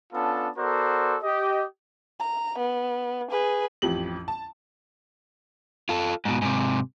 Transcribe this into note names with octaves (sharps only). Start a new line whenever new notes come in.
B3 C#4 D4 F4 A4 A5
B3 F#4 A4 A#4 C5 D5
G4 D#5
A#5
B3
G#4 B4
A1 F2 G4 F#7
A5
F4 A4
G#2 B2
G#2 C3